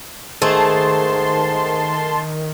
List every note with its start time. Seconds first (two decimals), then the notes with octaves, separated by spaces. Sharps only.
0.42 G#2 D#3 A3 G#4 A5 C6